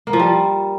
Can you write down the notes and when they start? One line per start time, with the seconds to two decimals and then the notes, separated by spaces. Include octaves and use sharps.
0.07 A#3
0.13 F3
0.19 G3